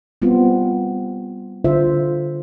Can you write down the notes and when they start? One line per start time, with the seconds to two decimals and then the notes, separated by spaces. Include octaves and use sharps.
0.22 G3 B3 C4 F4
1.64 D3 F4 C5 E5